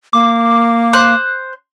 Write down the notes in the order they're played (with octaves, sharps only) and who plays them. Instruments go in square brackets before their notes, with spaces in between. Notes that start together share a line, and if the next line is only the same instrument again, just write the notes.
[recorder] A#3 [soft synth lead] D6
[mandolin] C5 F#6